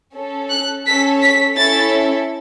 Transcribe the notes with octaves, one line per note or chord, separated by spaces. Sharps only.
C#4 A4
F#6
C#4 A4 B6
B6
C#4 E4 A4 A6